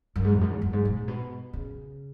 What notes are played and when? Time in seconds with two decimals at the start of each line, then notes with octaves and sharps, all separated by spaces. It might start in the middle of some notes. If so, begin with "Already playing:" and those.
0.16 F#2
0.25 G#2
0.33 E2
0.41 F#2
0.50 E2
0.62 F#2
0.73 G#2
0.85 B2
0.96 G#2
1.08 B2
1.53 C#3